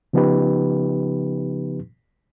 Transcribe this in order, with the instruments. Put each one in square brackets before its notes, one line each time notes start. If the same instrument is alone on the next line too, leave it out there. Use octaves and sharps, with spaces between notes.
[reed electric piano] C#3 F3 B3 D#4 G4 B4